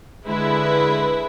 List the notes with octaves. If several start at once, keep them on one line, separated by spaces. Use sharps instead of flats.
D3 G#3 E4 B4